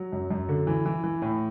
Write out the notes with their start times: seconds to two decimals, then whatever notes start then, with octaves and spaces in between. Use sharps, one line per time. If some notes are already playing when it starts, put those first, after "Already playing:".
Already playing: F#3
0.12 F#2
0.31 F#2
0.49 D3
0.67 E3
0.86 E3
1.04 E3
1.22 A2